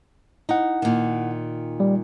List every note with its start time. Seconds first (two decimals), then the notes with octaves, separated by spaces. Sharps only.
0.49 D#4 E4 F#5
0.82 A#2 D#3
1.80 G3